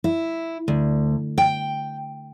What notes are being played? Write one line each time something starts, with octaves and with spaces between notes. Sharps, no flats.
E4
D2
G5